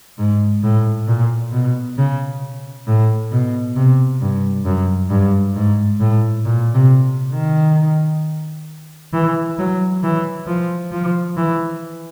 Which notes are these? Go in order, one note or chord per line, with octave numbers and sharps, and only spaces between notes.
G#2
A2
A#2
B2
C#3
A2
B2
C3
G2
F#2
G2
G#2
A2
A#2
C3
D#3
E3
F#3
E3
F3
F3
E3